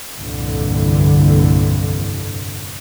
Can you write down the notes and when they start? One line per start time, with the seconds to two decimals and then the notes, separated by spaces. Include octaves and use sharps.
0.18 G1 C2 F2 A#2 D3 E3